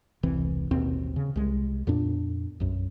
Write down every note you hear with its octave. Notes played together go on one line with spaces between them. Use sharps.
E1 C2 E3 C4
A1 D#2 B2 C4
C#3
C2 G#3
F2 A#2 B3 D4
B1 F#2